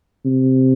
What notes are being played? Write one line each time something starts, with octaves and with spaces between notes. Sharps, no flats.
C3